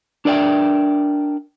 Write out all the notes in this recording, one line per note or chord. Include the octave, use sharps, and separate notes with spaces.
D4 A#4 D5 E5 G5